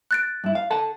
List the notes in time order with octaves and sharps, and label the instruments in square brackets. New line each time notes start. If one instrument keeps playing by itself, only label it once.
[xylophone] F#6 A6 D7
[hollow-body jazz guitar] G2 E4
F5
A4 F#5 A5